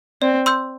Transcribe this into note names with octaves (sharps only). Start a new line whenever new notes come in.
C4 D5
C6 E6 G6